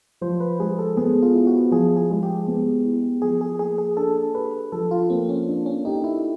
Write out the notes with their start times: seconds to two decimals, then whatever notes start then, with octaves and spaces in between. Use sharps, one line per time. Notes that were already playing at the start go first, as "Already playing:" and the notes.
0.21 F3 C5
0.40 B4
0.59 G#3 G#4
0.79 A4
0.97 B3 G#4
1.22 F4
1.34 E4
1.47 F#4
1.72 F3 G#4
1.97 G#4
2.10 G#3
2.23 G4
2.48 B3
2.85 E4
3.22 F3 G#4
3.41 G#4
3.59 A#3 G#4
3.78 G#4
3.97 D4 A4
4.35 G4 B4
4.72 F3 A4
4.91 F4
5.10 A#3 C4
5.29 C#4
5.48 D4
5.66 C#4
5.85 D#4 G4
6.04 E4